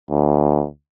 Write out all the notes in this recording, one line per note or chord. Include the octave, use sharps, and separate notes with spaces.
D2